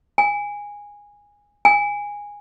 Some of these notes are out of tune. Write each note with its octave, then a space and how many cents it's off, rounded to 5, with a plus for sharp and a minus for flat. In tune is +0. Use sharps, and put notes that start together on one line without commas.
G#5 -15
G#5 -15